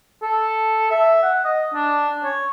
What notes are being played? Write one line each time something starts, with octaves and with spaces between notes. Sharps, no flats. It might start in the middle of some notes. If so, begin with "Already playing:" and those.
A4
E5
F#5
D#5
D4
C#5